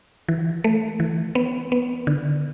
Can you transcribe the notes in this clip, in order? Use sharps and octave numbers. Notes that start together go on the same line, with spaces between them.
E3
A3
E3
B3
B3
D3